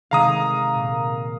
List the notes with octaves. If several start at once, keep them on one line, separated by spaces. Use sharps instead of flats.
C3 D#3 G#3 F5 A#5 D#6
A#2